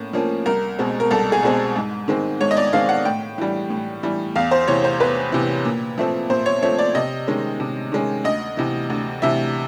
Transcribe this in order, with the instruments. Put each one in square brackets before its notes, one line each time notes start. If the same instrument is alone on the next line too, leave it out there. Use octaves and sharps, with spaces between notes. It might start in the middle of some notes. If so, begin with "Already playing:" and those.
Already playing: [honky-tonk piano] A2 A#3 C#4
F3 A#3 C#4
C2 A#4
B2 G#3 C4
A#4
C2 A4
G#4
B2 G#3 C4
G#2
D#3 G#3 C4
G#2 C#5
D#5
D5
D#3 G#3 C4 F5
F#5
A2 G5
E3 G3
A2
E3 G3
E2 F5
C5
C3 E3 C#5
C5
E2 B4
C3 E3
A#2
F3 A3 C4
A#2 C5
C#5
F3 A3 C4 C#5
D5
C3 D#5
D#3 G#3 C#4
C3
D#3 G#3 C#4
D2 D#5
C3 E3
D2
C3 E3 E5